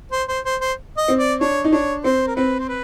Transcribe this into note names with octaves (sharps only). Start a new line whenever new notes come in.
C5
C5
C5
C5
D#5
C4
D5
D4 C#5
D#4
D4 C#5
C4 C5
A#4
C4 B4
C5
B4